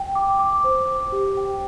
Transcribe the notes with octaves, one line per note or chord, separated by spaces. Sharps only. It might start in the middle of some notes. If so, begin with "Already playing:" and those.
Already playing: G5
D6
D6
C5
D6
G4
G5